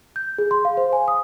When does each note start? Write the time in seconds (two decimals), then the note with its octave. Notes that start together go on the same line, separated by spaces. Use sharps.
0.16 G6
0.38 G#4
0.51 C6
0.65 F5
0.77 C5
0.93 G#5
1.08 D#6